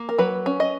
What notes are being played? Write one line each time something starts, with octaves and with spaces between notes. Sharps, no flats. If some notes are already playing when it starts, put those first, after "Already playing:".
Already playing: A#3
A#4
F#3 B4
C#4
D#5